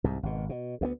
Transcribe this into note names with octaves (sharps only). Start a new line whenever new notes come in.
C2 G#2
G#1 B2
B2
D2 A3 B3